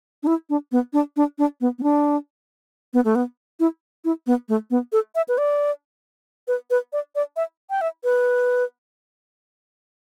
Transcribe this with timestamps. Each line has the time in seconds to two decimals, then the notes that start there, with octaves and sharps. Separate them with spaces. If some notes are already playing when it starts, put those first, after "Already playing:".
0.23 D4
0.27 E4
0.50 D4
0.72 B3
0.93 D4
1.16 D4
1.38 D4
1.61 B3
1.79 B3
1.83 D4
2.94 B3
3.05 A3
3.15 B3
3.60 E4
4.05 E4
4.27 B3
4.49 A3
4.70 B3
4.92 A4
5.15 E5
5.28 B4
5.38 D5
6.48 B4
6.70 B4
6.93 D5
7.15 D5
7.36 E5
7.70 G5
7.81 E5
8.04 B4